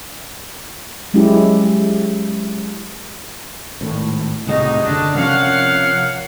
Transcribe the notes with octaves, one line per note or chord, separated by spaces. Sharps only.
F#3 G#3 C#4 E4 G4
G#1 A2
C2 A2 C3 D#4 F#4 G#4 D#5
F#1 D3 D4
C3 F3 A#3 C#4 C#5 F5 F#5